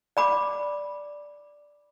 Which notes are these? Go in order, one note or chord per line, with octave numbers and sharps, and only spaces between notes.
D5 B5 D6